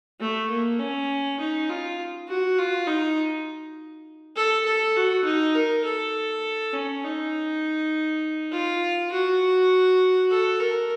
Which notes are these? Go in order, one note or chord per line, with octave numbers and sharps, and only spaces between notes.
A3
A#3
C#4
D#4
F4
F#4
F4
D#4
A4
A4
F#4
D#4
A#4
A4
C#4
D#4
F4
F#4
A4
A#4